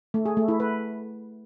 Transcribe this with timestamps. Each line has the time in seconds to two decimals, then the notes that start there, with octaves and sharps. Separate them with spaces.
0.14 A3
0.26 G#4
0.37 A3
0.48 E4
0.60 B4